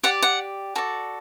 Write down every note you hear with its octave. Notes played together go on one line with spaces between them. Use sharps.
G4 D5 F#5
F#5
F#4 A4 D5